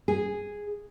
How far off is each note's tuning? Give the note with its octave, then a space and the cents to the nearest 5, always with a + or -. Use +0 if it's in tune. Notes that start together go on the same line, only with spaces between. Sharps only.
G#4 -5